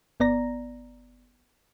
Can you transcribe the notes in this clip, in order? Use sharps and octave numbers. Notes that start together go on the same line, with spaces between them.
G1 B3 D5 A#5 A#6